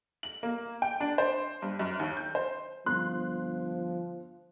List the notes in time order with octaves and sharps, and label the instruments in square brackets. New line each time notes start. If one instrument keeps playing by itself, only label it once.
[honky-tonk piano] F#7
A#3
G5
D4
C5
G2
F#2
D#2
G6
C5
[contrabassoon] G1 [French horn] F3 [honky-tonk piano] C6 F#6